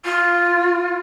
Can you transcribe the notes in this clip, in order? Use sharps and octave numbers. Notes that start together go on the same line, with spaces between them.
F4